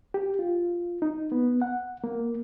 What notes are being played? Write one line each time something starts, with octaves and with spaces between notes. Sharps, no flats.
G4
F4
D#4
B3
F#5
A#3